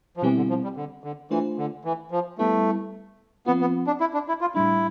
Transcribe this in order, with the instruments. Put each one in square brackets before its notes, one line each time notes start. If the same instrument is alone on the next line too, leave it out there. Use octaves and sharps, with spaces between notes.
[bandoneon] F3
[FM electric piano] B2 G3 C4 E4 G4 [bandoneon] E3
[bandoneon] D3
F3
G3
D3
D3
[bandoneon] E3 [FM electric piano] A3 D4 F4 C5
[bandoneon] D3
E3
F3
[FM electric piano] G3 B3 E4 B4 [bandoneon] A3
[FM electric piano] F3 C4 F4 [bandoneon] B3
[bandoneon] B3
D4
E4
D4
E4
F4
[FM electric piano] A2 G3 D4 [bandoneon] E4